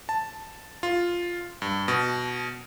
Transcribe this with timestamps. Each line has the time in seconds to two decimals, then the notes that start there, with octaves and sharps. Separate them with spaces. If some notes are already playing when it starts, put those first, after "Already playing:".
0.09 A5
0.83 F4
1.62 G2
1.88 B2